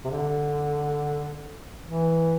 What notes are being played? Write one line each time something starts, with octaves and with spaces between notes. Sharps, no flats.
C3
D3
E3